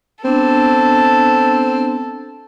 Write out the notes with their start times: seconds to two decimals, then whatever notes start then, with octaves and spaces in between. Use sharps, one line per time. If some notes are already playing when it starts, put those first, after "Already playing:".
0.25 B3 C4 D4 A4